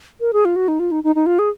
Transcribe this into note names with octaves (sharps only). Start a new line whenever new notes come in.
A#4
G#4
F4
F#4
D#4
F4
D#4
D#4
D#4
F4
G#4